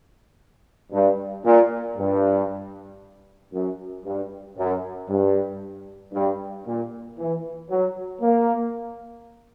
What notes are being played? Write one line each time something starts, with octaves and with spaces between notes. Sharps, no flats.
G2
A#2
G2
F#2
G2
F#2
G2
G2
A#2
E3
F#3
A#3